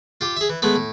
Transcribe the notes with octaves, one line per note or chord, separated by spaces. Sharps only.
F4 G4
G#4 E5
E3
G#3 A3 B3
A2